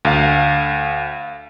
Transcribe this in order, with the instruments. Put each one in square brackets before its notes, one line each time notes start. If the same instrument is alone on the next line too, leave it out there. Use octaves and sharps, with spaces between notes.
[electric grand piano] D2 F5